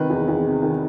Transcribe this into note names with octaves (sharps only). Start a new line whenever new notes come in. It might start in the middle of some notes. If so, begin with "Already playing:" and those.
Already playing: C3 D#3 B4
E2
E2
C3
D#3